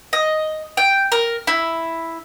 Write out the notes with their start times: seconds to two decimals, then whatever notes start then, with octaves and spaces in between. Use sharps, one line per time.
0.13 D#5
0.77 G5
1.12 A#4
1.47 E4